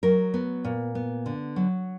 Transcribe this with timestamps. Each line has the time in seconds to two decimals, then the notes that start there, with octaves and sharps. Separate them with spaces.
0.03 F#3 A#4
0.34 B3
0.64 A#2
0.95 B3
1.26 D3
1.56 F#3